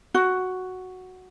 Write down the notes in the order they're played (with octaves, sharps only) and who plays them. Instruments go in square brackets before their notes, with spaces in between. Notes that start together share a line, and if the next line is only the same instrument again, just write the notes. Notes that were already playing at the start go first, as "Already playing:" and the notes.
[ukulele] F#4